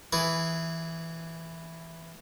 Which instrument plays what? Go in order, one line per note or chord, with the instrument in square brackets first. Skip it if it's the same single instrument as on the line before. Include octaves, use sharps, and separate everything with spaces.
[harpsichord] E3 G#4 B4